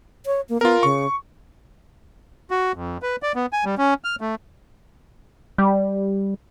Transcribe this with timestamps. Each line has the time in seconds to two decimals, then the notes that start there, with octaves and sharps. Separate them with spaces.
0.26 C#5
0.49 A#3
0.61 B3 F4 A#4
0.83 C#3 C#6
2.51 F#4
2.75 F2
3.02 B4
3.23 D5
3.35 B3
3.53 G#5
3.65 G3
3.78 C#4
4.04 F6
4.21 A3
5.58 G3